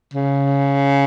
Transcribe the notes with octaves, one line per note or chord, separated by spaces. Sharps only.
C#3